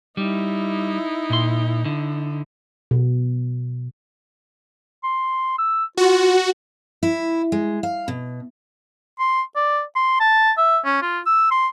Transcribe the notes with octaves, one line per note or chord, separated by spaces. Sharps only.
G3 D#4 E4
A#2 C6
D3
B2
C6
E6
F4 F#4
E4
G#3
F5
B2
C6
D5
C6
A5
E5
C#4
F4
E6
C6